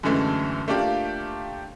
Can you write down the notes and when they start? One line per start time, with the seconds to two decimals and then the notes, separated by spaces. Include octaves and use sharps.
0.03 F#2 D3 E3 G#3 A3
0.68 A3 A#3 D4 F4 G4